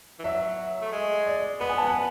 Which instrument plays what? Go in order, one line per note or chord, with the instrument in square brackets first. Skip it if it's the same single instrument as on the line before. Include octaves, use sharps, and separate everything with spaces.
[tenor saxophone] E3
[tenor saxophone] F#3 [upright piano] E5
[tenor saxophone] A3
G#3
[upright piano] D5
[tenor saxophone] B3 [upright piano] B4
[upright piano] G#5
A5
G#5
F#5